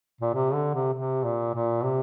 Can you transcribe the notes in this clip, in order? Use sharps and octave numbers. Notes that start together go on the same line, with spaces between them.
A#2
C3
D3
C3
C3
A#2
A#2
C3